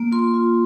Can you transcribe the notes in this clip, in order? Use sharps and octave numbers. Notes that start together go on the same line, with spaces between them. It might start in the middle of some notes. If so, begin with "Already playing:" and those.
Already playing: A#3
F4 C6
F4